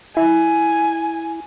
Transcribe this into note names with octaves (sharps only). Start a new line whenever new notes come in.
E4 G#5